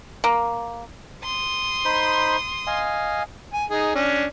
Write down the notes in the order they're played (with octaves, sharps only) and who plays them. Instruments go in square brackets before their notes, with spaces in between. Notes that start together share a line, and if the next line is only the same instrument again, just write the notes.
[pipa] A#3
[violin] C6 D#6
[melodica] D#4 C5 B5
D#5 F5 G#5
[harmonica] G#5
D#4 G#4
C#4 D4